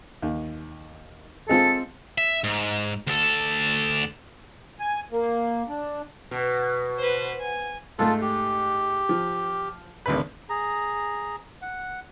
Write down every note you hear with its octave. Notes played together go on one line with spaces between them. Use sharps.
D#2
G#3 C4 F4 A4
E5
G#2
D2 A4
G#5
A#3
D4
B2
B4 C5
G#5
G#2 A3 F4 A4
G4
F3
G#1 D2 B4
G#4 A#5
F#5